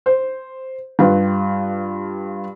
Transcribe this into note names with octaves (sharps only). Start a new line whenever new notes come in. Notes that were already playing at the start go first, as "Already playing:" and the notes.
C5
G2 F4 G4 B4